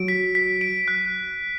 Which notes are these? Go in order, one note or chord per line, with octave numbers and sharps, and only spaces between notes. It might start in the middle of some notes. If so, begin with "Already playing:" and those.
Already playing: F#3 D7
B6
B6
D7
F#6